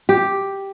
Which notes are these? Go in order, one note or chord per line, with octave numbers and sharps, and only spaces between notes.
G4